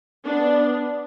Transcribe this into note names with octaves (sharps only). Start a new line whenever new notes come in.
B3 D4